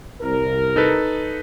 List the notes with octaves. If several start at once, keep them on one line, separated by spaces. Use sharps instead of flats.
C2 A#4
D#4 A4 B4